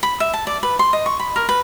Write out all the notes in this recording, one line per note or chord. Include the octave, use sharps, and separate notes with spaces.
B5
E5
A5
D5
B4
C6
D#5
C#6
B5
A#4
B4